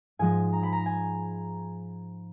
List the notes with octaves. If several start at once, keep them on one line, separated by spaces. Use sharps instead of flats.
G#2 F3 G#3 G#5
A#5
B5
A#5
G#5